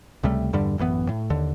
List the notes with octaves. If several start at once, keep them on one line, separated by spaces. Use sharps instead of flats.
C#2 C3 G3 A3
E2 G2 D3 G3
A1 F#2 E3 B3
A2
D#2 D3